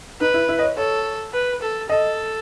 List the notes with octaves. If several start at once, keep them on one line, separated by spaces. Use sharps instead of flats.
D#4 B4
E4
E4
D#5
C#5
A4 C#5
B4
A4
A4 D#5